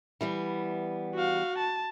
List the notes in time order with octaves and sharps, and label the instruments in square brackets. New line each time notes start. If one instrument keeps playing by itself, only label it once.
[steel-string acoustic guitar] E3 G3 B3
[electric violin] F#4 F5
A5